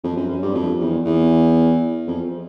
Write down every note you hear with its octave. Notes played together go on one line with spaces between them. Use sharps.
F2
F#2
F#2
G2
F2
E2
E2
F2